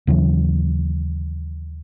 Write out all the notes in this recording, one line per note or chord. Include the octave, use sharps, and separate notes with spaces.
D#2 C#3 E3 F#3